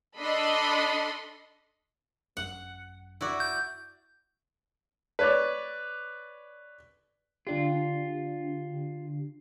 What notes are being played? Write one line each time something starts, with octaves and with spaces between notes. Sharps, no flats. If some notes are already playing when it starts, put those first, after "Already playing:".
D4 A4 D#5 B5 C6
G#1 F#2 F#5
E4 F#4 D5
G6
B4 C#5 D5
D3 D4 F4 G4